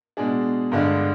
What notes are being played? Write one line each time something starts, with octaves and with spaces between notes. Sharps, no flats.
B2 G#3 D4 G#4
G2 D3 G#3 D4